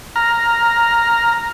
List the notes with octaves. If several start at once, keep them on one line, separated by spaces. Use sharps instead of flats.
A#5 F6